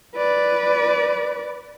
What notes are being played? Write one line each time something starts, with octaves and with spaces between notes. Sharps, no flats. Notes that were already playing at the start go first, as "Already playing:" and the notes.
B4 D5